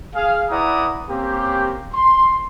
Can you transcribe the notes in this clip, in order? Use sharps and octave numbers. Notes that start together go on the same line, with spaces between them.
G#4 F5
E4 B4 D5 F#5 A#5 D#6
A#3 C4 C#4 G4
C6